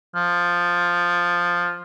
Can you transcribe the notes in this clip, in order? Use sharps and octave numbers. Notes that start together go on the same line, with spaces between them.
F3